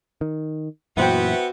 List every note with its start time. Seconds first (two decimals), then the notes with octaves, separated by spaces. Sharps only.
0.21 D#3
0.97 F#2 A#2 E3 B3 E4 F#4 C5 G5